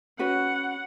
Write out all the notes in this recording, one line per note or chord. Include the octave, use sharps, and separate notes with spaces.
C#4 F#4 B4 F#5